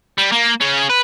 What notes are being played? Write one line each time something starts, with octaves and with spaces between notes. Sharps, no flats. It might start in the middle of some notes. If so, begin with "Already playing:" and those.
G3
A#3
C#3 C#4
B4